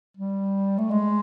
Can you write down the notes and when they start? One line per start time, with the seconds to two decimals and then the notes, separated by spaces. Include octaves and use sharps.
0.17 G3
0.78 A3
0.91 G#3